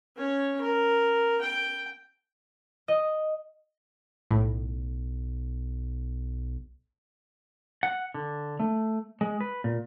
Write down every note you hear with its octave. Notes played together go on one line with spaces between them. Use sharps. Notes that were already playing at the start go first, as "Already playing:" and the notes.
C#4 C#5
A#4
G5
D#5
B1 A2
F#5
D3
A3
G#3
B4
A#2